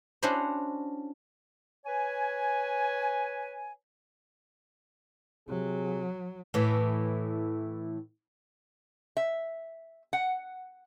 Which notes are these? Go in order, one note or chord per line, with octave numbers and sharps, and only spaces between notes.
C#4 D4 E4 F#4 C5
B4 C#5 G#5
C3 F#3 G#4
A2 E3
E5
F#5